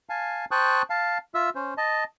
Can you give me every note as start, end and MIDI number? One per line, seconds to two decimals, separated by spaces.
0.09 0.45 77
0.09 0.45 80
0.09 0.45 81
0.51 0.82 72
0.51 0.82 79
0.51 0.82 81
0.51 0.82 85
0.51 0.82 87
0.51 0.82 90
0.90 1.18 77
0.90 1.18 81
1.35 1.50 65
1.35 1.50 76
1.35 1.50 88
1.55 1.74 61
1.55 1.74 72
1.78 2.04 75
1.78 2.04 81